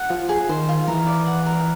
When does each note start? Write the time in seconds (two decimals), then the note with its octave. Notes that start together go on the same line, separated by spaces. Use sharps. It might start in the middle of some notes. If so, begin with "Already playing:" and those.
Already playing: F#5
0.09 F3 F4
0.29 G#4
0.49 D#3 C5
0.69 F4
0.88 E3 A#4
1.07 D5
1.26 F#5
1.46 A#4